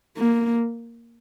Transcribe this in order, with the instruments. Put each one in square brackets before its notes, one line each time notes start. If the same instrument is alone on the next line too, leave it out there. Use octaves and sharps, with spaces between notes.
[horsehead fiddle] A#3